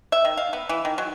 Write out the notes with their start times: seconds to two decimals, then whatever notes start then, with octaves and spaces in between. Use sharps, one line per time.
0.12 E5
0.25 D#3
0.37 F5
0.53 B3
0.69 E3
0.85 D#3
0.98 F#3